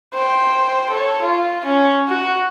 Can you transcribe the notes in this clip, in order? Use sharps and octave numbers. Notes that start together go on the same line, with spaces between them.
C5 G5
A4 C#5
F4
C#4
F#4